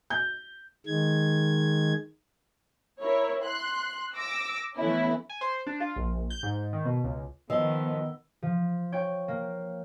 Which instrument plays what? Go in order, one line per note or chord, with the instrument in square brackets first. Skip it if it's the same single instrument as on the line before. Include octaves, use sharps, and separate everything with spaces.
[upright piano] G6
[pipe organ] D#3 G#3 G#6
[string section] E4 A#4 C#5
C6 F#6
D6 E6 A#6
E3 A3 B3 C#4 E4
[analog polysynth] G#5
C5
D4
F4
A#1
G6
G#2
D#3
B2
C#2
[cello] D#3 B3 [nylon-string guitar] F3 [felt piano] D#5 [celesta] E6 G7
[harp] F3
C#5 G5
A#3